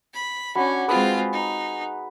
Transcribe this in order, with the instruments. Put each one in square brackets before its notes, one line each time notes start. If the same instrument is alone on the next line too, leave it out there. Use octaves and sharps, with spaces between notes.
[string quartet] B5
[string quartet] C#4 [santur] D4 F#4 B5
[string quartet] G#3 C4 F4 [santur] G#4 B4 D#6
[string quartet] D#4